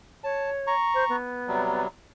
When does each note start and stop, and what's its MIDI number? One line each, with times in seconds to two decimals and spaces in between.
0.24 0.74 73
0.24 0.50 81
0.67 1.16 82
0.67 1.16 85
0.94 1.04 72
1.09 1.85 59
1.48 1.87 48
1.48 1.87 54
1.48 1.87 55